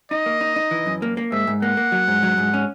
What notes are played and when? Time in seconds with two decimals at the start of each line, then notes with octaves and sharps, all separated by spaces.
0.11 D#4 D#5
0.26 A#3
0.41 D#4
0.56 D#4
0.71 E3
0.86 F#2
1.02 A#3
1.17 A#3
1.32 G#2 E5
1.47 G#2
1.62 A#3 F#5
1.77 A#3
1.92 F#3
2.08 G#2
2.23 F#3
2.38 G#2
2.54 C#4